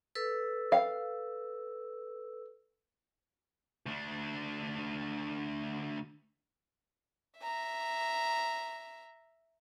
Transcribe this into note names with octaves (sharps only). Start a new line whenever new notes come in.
A4 B4 E6
F5
D2 D4
E5 A#5